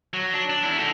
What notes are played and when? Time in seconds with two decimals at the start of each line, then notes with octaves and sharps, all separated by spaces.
0.13 F#3
0.33 D4
0.50 D4
0.63 E2 E4
0.79 D#4 A4